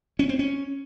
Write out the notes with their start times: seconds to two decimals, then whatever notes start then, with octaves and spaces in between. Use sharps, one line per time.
0.19 C#4
0.29 C4
0.39 C#4